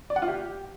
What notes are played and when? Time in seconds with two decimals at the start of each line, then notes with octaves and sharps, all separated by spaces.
0.10 D5
0.16 F#5
0.22 F4
0.28 G4